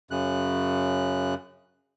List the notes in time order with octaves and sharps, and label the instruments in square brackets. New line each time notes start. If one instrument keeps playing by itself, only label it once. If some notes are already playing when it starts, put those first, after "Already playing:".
[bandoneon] F#2 C#3 F#6